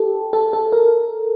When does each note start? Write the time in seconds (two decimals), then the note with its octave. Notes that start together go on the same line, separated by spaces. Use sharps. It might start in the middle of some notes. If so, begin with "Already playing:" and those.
Already playing: G4 A4
0.33 A4
0.53 A4
0.72 A#4